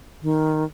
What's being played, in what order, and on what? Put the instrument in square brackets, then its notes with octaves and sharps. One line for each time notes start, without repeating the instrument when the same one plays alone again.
[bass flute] D#3